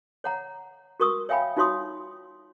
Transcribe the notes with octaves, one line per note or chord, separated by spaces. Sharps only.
C#5 F#5 A#5
F#4 A#4 C#6 D#6 E6
C#5 E5 F5 G5 G#5 B5
D#4 F4 F#4 C#5 C6 D#6